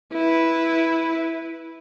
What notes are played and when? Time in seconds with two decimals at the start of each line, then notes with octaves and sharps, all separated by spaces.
0.13 E4 B4